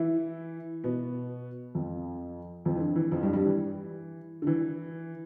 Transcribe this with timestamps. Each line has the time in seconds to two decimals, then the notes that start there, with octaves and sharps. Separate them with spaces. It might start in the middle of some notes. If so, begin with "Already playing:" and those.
Already playing: E3 E4
0.84 B2 B3
1.75 F2 F3
2.65 F2 F3
2.76 E3
2.81 D3
2.96 E3
3.11 F2 F3
3.23 G2 G3
3.33 G2 G3
3.45 E3
4.42 D3
4.47 E3